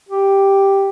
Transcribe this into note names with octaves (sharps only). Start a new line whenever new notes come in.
G4